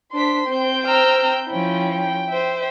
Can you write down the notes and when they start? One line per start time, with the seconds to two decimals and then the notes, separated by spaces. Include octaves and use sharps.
0.13 D4 C5 C6 B6
0.47 C4 G5 G6
0.86 A#5 E6 F6
1.49 F3 C#4 E4 G5
2.31 C5 E5